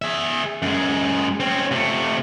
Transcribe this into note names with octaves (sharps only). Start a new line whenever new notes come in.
G#4 E5
F#2 G#3
C4 C#4
C3 A3